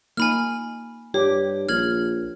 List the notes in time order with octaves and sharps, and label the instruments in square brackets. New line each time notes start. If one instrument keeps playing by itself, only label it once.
[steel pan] A#3 D#4 [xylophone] G#5 B5 F6
[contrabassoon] G2 [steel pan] G4 [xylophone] C#5
[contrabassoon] A#1 [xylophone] F6 G#6 F#7